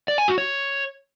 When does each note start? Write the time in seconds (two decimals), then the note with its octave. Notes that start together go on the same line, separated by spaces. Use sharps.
0.08 D5
0.18 G#5
0.28 F#4
0.38 C#5